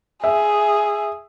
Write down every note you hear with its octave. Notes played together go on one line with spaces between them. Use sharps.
G#4 E5